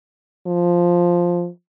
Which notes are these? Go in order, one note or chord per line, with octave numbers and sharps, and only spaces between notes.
F3